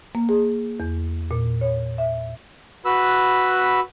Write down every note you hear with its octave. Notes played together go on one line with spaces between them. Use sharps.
A#3
G#4
E2
A#2
C#5
E5
F#4 B4 B5 E6